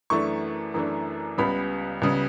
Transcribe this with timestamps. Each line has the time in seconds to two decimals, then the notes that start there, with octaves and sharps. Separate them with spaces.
0.10 F#2 E3 A3 D4 C#6
0.74 F#2 E3 A3 D4
1.38 C#2 C#3 G3 B3 B5
2.02 C#2 C#3 G3 B3